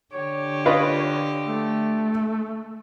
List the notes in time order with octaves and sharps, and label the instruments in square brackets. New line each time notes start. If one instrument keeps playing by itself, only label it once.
[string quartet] D3 G4 [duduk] C#5
[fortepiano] F4 B4 D#5
[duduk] A3